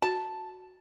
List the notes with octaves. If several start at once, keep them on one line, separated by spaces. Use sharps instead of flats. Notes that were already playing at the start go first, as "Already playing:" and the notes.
F#4 A5